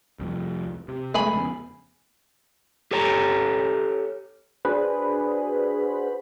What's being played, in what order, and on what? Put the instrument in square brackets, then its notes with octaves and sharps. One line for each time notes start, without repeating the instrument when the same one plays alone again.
[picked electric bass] C2 F2
C3
[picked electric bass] F1 G#3 A3 [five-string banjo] G#4 G#5 B5
[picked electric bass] F2 C#3 B3
[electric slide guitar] G4 A4 C#5 A#5
[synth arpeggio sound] D4 F#4 G#4 B4 C5 B5